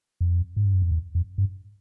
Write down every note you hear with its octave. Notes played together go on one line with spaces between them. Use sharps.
F2
G#2
G2
F#2
F2
E2
F2
G2